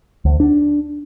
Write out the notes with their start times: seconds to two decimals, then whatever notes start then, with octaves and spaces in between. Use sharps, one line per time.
0.25 D2
0.40 D4